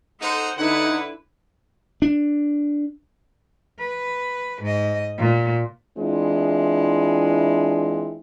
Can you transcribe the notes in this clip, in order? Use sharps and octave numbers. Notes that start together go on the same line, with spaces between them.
D#4 A4 C5 F#5
D3 D#4 E4 B4 F#5
D4
B4
G#2 D#5
A#2
E3 G#3 C4 D4 E4 F4